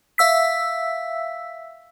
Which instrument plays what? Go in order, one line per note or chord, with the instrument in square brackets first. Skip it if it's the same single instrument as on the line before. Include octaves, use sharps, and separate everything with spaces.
[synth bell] E5 F5 E6 B6